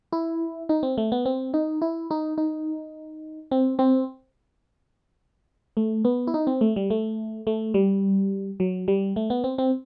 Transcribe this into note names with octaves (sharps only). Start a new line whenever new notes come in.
E4
D#4
C4
A3
B3
C4
D#4
E4
D#4
D#4
C4
C4
A3
B3
E4
D#4
C4
A3
G3
A3
A3
G3
F#3
G3
A3
B3
C4
C4